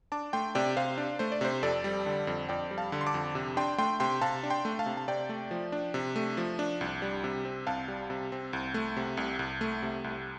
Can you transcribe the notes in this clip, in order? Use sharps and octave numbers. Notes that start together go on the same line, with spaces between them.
D4 A5 D6
A3 G5 C6
C3 D5 G5
C3 C5 F5
D4
A3 C5
D5
C3 C5
F2 A4 D5
G3
D3
F2
F2 D5 G5
G3
F5 A5
D3
C6
A5 D6
F2
C3
D4 G5 C6
A3 G5 C6
C3 G5 C6
C3 F5 A5
D4
G5 C6
A3
F5 A5
C3
A5
C3 D5 G5
A3
F3
D4
C3
A3
F3
D4
C2
G3
C3
C4
C2 F5 A5
G3
C3
C4
C2
A3
C3
C2
C2
A3
C3
C2